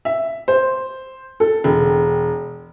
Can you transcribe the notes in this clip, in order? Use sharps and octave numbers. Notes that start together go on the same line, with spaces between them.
E5
C5
A4
E1